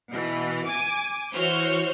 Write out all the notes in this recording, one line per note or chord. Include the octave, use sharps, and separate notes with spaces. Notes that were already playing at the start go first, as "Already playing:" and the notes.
B2 E3
G#5 D6
E3 F#4 C5 C#5 F6 G6